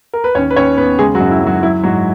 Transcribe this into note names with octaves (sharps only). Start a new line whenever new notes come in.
A#4
B4
D#2 C#4 C#5
B4
D#2 C#4 C#5
D#2 B3 B4
C#3 G#3 G#4
F#3 F#4
F#2
E4
F#2
F#3 F#4
F#3 E4
G#2 F#3 F#4